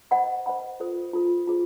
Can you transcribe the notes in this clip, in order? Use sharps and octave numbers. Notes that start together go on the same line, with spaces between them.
C5 D#5 F#5 B5
C5 D#5 F#5 B5
F4 A4 C5
F4 A4 C5
F4 G#4 C5